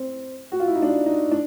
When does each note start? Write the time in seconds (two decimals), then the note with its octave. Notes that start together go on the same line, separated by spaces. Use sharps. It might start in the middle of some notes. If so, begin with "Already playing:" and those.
Already playing: C4
0.52 F#4
0.60 F4
0.67 E4
0.75 D#4
0.82 D4
1.06 D#4
1.31 D4